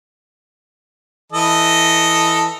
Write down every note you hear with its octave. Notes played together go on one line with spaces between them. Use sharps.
E3 A4 D#5